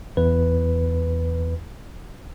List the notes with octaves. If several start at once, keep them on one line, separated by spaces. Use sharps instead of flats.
E2 B4